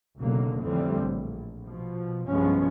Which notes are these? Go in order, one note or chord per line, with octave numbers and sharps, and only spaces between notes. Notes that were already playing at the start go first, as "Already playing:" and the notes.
F#1 B1 B2 D3 F#3 A#3
F2 A2 D3 E3 G3 C4
A#1
B2 F3
B1 G2 F3 G#3 B3 C#4